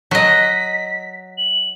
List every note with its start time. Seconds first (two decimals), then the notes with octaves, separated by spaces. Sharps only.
0.11 F#3 D#5 B6
1.38 F#7